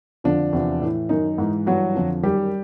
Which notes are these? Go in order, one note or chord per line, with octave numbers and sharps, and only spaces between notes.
F2 D3 F3 D4
E2 C3 F3
A2 E3
F#2 D#3 D#4
G#2 E3
G2 E3 F#3 F#4
F2 D3 F3
F#2 D#3 G3 G4